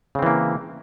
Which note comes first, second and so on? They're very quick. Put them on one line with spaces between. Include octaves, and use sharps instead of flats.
C#3 C4 E3 A#3